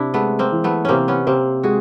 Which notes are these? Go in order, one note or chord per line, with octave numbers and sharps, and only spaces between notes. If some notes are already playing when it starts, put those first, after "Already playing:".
Already playing: C3 D4 E4
G#3 A3 B3
A#3 C4
E3
A3 B3
C3 A#3 C4 C#4
B3 C#4
C3 A#3 C4
G#3 F#4 G#4